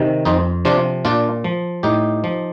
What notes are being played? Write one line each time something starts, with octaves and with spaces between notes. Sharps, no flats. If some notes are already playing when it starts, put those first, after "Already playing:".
Already playing: C3 D#3
F2 C4 D#4
C3 F3 D4 F4
A#2 D4 F4
F3
A2 D#4 G4
F3